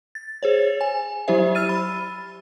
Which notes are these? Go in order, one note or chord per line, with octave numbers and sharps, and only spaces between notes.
A6
G#4 C5 C#5
G#5
F#3 E4 G4 C5 E5
E6 F6 A6 D#7
B5